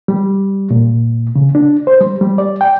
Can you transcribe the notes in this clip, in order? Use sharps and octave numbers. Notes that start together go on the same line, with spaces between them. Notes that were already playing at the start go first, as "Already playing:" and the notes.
G3
A#2
C#3
D4
C5
G3
G3
D5
G5